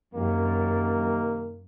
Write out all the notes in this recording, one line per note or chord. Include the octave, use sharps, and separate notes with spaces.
F#2 C3 D#3 A#3